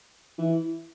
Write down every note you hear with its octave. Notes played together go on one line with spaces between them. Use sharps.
E3